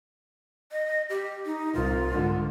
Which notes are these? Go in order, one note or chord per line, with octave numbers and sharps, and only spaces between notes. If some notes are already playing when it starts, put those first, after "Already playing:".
D#5
G4
D#4
C2 F4
G#2 D3